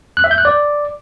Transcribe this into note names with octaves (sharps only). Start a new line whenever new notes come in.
F#6
E5
G6
F#6
D5